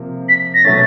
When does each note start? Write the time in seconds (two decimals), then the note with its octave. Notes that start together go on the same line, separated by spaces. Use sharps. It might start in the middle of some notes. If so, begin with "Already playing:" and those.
Already playing: C3 F3 A#3
0.29 B6
0.54 A#6
0.64 B2 F#3 A3 C#4 A6